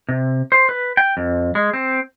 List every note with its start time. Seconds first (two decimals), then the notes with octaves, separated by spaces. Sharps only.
0.09 C3
0.52 C5
0.69 B4
0.97 G5
1.17 F2
1.55 G#3
1.74 C4